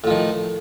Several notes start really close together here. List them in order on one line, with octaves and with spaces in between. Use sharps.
A2 F3 D#3